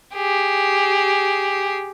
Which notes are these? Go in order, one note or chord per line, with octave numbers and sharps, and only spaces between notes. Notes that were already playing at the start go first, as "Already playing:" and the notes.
G4 G#4